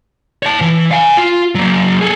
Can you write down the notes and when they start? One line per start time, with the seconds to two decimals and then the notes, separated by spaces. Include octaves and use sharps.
0.43 C#5 A5
0.61 E3
0.92 F5 G#5
1.17 F4
1.55 F#3 A#3
2.01 G#4 A4